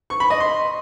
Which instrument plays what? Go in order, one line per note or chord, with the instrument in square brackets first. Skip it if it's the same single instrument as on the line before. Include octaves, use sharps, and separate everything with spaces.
[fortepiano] C#6
B5
D#5
C6